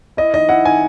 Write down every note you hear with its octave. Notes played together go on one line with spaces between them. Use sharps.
E4 D#5
D#3 D#5
E4 F#5
D#3 G#5